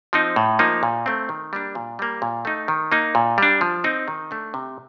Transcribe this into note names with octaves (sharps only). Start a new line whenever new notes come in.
F3 C4 D#4
A2
F3 A#3 D#4
A#2
A3 C4
D#3
G3 A#3 D4
A#2
G3 A#3
A#2
A3 D#4
D#3
A#3 D#4
A#2
G3 D4
F3
C4 D#4
D#3
A3 D4
C3